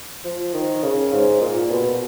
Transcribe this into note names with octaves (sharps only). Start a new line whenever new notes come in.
F3
D#3
C#3
G#2
A#2
B2